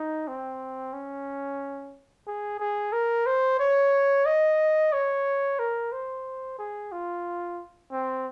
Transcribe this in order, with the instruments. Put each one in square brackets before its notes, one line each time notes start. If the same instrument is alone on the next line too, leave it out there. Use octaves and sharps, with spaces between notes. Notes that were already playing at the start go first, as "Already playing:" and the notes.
Already playing: [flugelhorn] D#4
C4
C#4
G#4
G#4
A#4
C5
C#5
D#5
C#5
A#4
C5
G#4
F4
C4